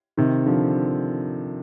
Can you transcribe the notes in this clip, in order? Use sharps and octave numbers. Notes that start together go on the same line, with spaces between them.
C3 D#3
D3 F3